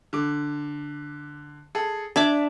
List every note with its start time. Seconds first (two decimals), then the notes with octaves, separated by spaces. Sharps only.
0.13 D3 D6
1.75 G#4 A4
2.16 D4 E5 A5 D6 G#6